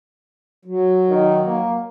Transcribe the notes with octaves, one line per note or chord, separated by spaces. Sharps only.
F#3
D#3
A#3